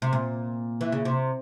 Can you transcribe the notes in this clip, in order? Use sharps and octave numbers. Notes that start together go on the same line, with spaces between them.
C3
A#2
E3
C#3
C3